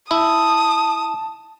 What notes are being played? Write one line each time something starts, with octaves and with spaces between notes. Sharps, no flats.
E4 A5 D#6